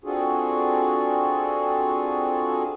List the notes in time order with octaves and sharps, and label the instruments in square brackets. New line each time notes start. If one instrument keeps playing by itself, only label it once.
[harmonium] C4 D4 F4 F#4 G#4 A4